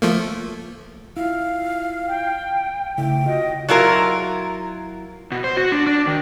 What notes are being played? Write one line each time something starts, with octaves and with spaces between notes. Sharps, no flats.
F3 A3 A#3
E4 F4 F5
G5
C#3 A3 E4 G5
F4 F#4 D#5
F#3 E4 F4 A#4
B2
C5
F#4
D4
D4
D#3